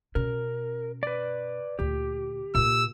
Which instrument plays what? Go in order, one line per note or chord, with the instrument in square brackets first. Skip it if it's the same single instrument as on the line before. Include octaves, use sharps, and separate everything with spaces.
[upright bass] B2 C#4 [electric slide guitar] A#4
[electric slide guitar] B4 D5
[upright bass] D2 A#2 [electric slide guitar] G4
[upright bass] A#2 A#3 [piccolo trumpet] E6